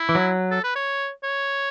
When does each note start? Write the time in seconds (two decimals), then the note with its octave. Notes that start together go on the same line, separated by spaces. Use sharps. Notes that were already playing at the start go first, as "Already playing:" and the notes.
Already playing: E4
0.09 E3
0.15 F#3
0.51 A4
0.64 B4
0.76 C#5
1.24 C#5